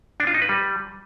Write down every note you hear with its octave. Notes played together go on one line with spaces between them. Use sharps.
D4
F4
D#4
B4
G3